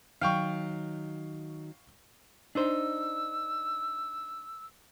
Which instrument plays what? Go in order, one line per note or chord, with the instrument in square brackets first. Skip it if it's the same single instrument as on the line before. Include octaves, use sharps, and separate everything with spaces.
[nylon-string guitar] D#3 F#3 [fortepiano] F5 G5 C#6
[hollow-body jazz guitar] D4 D#4 C5 [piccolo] E6